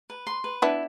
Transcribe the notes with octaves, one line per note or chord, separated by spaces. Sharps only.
B4
C6
B4
B3 D4 E4